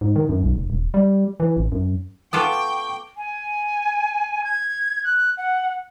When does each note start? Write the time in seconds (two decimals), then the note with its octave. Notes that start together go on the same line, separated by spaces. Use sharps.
0.01 G#2
0.16 D#3
0.29 F#2
0.43 B1
0.56 F1
0.70 D#1
0.94 G3
1.40 E3
1.57 A1
1.72 F#2
2.33 B3 F4 A4 G5 C#6 D6
3.17 G#5
4.44 G#6
5.04 F#6
5.37 F#5